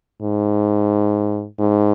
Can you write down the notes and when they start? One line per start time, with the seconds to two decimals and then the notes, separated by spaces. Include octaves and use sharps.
0.22 G#2
1.59 G#2